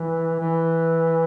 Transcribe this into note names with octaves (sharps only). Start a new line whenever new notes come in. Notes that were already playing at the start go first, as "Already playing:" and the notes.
Already playing: E3
E3